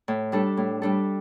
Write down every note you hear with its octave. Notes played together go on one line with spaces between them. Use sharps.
A2
G3 D4 A4
A2
G3 D4 A4